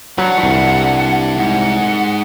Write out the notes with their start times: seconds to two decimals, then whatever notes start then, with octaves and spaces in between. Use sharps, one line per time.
0.18 F#3 D4 B4 F#5
0.43 C2
1.38 G#2 F#5